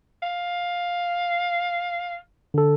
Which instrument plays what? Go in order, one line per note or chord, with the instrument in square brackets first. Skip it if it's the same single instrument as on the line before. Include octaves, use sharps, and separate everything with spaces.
[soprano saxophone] F5
[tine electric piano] D3 A4